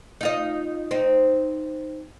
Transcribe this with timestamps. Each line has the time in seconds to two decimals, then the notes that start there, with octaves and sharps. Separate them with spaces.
0.21 D#4 F4 D#5
0.91 C4 D#4